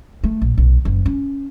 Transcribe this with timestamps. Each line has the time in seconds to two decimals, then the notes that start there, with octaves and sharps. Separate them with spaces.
0.24 A3
0.42 A#1
0.58 B1
0.85 F#1
1.06 C#4